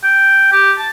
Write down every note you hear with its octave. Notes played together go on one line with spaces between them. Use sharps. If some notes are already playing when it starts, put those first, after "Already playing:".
G5
G4
A5